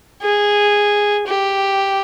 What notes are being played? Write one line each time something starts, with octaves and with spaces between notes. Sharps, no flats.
G#4
G4